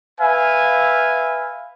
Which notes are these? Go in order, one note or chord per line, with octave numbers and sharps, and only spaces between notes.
B4 E5 F5 G#5